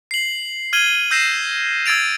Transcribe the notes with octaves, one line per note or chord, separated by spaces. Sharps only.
C7 F#7
F6 G#6 D#7 F#7 G7
E6 G6 A#6 C7 E7
E6 G#6 A6 D7 F7